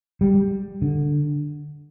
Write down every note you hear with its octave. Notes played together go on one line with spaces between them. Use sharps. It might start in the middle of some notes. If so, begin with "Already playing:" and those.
G3
D3